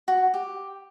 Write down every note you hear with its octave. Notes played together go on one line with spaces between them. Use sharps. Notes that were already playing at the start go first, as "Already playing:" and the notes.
F#4
G4